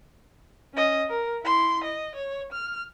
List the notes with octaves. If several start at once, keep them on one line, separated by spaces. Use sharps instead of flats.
C#4 D#5
A#4
E4 C6
D#5
C#5
F6